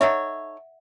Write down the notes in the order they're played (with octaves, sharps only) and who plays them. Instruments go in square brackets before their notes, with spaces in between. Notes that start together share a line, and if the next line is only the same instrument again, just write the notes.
[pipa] D#4 A4 C#5 [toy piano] E5 F#5